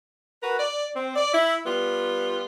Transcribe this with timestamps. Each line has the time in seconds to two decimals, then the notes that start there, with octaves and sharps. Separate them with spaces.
0.43 F#4 A#4 B4
0.59 D5
0.96 C4
1.16 D5
1.34 E4
1.66 G3 B3 F4